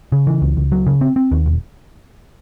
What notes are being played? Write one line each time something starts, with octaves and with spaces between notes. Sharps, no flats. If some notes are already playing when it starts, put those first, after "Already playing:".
C#3
E3
C#2
C#2
F#3
C#3
C4
C4
D#2
E1